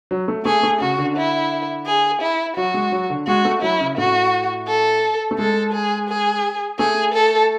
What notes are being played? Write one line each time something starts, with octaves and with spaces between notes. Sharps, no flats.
F#3
A3
A3 G#4
A3
C#3 F#4
D3
E4
G#4
E4
F#3 F#4
G#3
F#3
D3
G#3 F#4
A3
F#3 E4
C#3
A2 F#4
A4
A3
G#3 A4
G#4
G#4
A3 G#4
A4